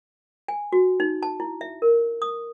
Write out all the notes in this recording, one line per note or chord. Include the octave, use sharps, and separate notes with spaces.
G#5
F#4
D#4
A5
E4
E5
A#4
D#6